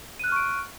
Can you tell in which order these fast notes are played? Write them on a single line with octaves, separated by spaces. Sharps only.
D#7 F#6 F6 C#6 D7